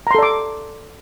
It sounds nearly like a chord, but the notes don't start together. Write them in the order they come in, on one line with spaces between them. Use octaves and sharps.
A#5 C6 A4 D5 D6